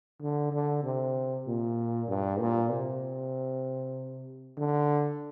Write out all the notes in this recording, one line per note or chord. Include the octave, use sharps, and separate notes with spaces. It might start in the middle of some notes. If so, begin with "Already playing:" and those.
D3
D3
C3
A#2
G2
A#2
C3
D3